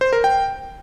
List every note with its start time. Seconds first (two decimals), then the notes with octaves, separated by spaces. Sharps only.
0.01 C5
0.13 A#4
0.24 G5